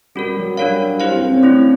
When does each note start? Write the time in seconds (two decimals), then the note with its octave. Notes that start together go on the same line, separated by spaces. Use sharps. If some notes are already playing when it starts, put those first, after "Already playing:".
0.15 G3 C#4 F#4 A#4
0.36 F#3
0.57 G3 D4 F#4 A#4 C#5 F5
1.00 E4 G4 C5 F5
1.11 C4
1.22 C4
1.32 C#4
1.42 A3 C#4 D4 E4